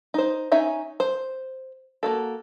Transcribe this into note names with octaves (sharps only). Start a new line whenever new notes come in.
D#4 C5
C#4 D#4 E5 G#5
C5
A#3 F#4 A4